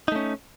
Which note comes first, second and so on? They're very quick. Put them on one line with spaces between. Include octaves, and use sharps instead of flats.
D#4 A3 C#4